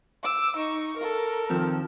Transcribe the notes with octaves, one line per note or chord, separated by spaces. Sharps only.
D6 E6
D#4 C#6
A4 A#4
D#3 F3 C4